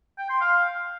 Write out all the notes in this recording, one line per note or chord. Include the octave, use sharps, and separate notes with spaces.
G5
C6
F5